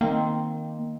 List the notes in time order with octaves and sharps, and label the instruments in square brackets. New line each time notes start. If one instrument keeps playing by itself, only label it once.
[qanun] D#3 C4 [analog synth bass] A#3